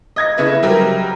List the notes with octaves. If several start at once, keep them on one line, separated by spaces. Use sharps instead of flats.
D#5 G#6 A#6
C#3 A3 E4 B4
F#3 G3 G4 A#4